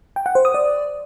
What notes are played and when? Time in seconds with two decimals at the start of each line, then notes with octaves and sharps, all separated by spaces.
0.16 G5
0.26 F#5
0.35 C5
0.45 D#6
0.54 D5